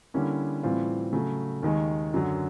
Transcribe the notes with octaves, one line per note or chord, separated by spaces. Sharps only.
D3 G3 A#3 C#4 E4
A2 E3 G3 C4 F4
C#3 F#3 A3
D#2 D#3 G#3
F#2 D3 F#3